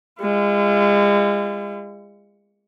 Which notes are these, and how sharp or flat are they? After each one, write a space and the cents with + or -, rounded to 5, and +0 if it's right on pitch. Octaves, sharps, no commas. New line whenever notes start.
G#3 -35 F4 -40